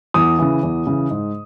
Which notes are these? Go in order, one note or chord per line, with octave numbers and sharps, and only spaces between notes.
E2 D#6
C#3 E3
E2
C#3 E3
G#2